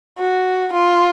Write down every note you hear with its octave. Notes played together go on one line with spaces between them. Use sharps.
F#4
F4